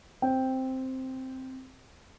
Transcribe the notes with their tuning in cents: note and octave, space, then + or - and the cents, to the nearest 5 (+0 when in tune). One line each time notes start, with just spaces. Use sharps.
C4 +0 G5 +0